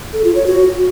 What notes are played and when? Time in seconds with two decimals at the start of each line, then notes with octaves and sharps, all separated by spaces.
0.13 A4
0.24 F4
0.35 C#5
0.46 F#4